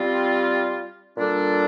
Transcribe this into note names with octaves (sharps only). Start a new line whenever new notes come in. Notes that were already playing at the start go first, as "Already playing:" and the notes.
Already playing: G3 C4 F4
A#2 G3 D4 A4